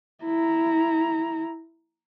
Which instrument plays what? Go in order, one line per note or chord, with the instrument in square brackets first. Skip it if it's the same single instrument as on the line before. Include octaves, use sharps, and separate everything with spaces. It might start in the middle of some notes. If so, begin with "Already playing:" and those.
[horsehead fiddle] E4 A#5